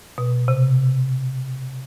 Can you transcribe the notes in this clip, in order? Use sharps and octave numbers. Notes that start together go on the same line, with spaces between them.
B2
C3